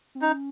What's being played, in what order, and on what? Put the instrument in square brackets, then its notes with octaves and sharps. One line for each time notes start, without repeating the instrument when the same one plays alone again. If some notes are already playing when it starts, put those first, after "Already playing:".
[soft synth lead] C4
[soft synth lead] C#4 [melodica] D#4